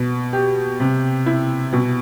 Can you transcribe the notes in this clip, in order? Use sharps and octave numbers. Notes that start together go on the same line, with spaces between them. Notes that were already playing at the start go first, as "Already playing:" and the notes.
Already playing: B2
G4
C3
E4
B2